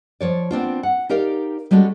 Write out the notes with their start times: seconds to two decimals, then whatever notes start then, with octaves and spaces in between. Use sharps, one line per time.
0.21 F3 C#5 D5
0.51 B3 C4 D4 F4
0.83 F#5
1.09 D#4 G4 A#4 D5 F5
1.71 G3 G#3 C#4 F#4 A4